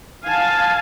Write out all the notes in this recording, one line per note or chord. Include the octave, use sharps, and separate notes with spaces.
F5 G#5 A5